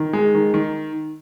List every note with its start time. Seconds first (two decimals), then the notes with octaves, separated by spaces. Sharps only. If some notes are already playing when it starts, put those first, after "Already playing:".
Already playing: D#3
0.13 G#3
0.34 D#3
0.54 D#3